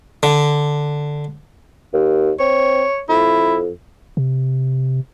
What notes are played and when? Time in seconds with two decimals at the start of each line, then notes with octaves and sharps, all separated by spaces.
0.23 D3
1.93 D#2
2.40 C4 C#5
3.09 F2 E4
4.17 C3